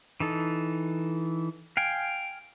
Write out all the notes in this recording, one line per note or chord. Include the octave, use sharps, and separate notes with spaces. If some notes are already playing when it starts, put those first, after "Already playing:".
E3 D#4 A4
F5 G5 G#5